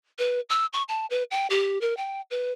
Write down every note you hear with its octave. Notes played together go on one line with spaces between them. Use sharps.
B4
E6
C#6
A5
B4
G5
G4
A#4
G5
B4